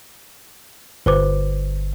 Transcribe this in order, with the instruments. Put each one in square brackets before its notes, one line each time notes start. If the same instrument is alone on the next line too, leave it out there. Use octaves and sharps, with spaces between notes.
[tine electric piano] G1 [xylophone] B4 C5 D6